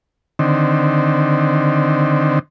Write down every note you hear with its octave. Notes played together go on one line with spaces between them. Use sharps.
D3 D#3 C4